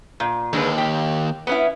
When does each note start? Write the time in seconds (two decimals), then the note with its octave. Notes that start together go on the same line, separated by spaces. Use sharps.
0.20 A#2
0.53 D#2 D3 G#3 B4
0.78 G4
1.47 B3 C#4 E4